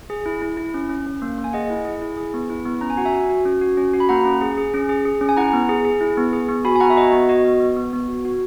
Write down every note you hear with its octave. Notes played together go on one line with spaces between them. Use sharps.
G#4
E4
E4
E4
C#4
C#4
C#4
A#3
A#3
G#5
G#4 D#5 F#5
E4
G#4
E4
G#4
B3
E4
B3
C#4 A#5
G#5
F#4 F#5
E5 G#5
F#4
F#4
C#4
F#4
C#4
F#4
B5
A#3 F#5 A#5
C#4
G#4
G#4
C#4
G#4
G#4
C#4
G#5
E4 F#5 A#5
B3
G#4
G#4
E4
B3
G#4
B3
F#4 G#5 B5
G#5
B3 F#5 A#5
E5
F#4 D#5 F#5
B3 D#5
F#4 D#5
B3
B3
B3
B3
F#4
F#4